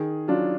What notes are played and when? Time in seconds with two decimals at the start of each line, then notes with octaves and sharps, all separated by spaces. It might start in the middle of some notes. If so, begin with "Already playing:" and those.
Already playing: D#3 G#4
0.28 F#3 D4 F4